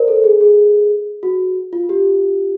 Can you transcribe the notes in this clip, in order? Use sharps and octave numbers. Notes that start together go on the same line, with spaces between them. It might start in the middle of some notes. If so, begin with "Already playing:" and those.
Already playing: A#4 C5 D5
A4
G#4
G#4
F#4
F4
G4